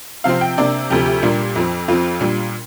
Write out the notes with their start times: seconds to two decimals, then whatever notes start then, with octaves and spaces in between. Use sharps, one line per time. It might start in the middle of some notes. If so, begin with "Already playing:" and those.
0.24 C3 F3 C4 F5
0.41 G5
0.58 C3 A#3 D4 D5
0.90 D2 C3 F3 G4
1.06 G4
1.22 A#2 G3 A#3 D4
1.56 F2 F3 C4
1.88 F2 F3 C4 F4
2.20 A#2 G3 D4